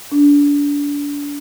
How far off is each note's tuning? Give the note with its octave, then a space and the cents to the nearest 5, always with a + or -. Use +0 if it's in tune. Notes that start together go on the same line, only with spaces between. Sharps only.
D4 -30